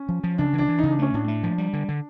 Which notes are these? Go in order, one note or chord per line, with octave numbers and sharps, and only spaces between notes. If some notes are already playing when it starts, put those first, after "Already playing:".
Already playing: C#4
F3
F3
C#3 D4
E3
D4
E3
C#3 D#4
D4
A3 C#4
A2 D4
A3
F3
G3
D3
D3